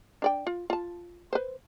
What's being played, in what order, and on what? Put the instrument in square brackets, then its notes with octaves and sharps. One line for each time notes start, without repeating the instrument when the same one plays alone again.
[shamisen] D4 D5 G5
F4
F4 A5
B4 C5